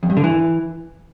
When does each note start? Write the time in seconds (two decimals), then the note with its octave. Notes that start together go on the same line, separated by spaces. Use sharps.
0.03 F2
0.10 G2
0.17 D3
0.24 E3